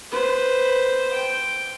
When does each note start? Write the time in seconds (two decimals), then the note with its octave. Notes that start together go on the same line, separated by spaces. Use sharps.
0.11 B4 C5
1.13 G5